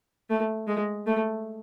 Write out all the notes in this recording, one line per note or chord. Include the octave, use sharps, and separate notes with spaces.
A3
G#3
A3